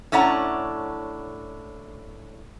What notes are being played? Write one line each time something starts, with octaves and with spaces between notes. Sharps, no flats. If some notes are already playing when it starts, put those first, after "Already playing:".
A2 C#4 D4 F#5 A#5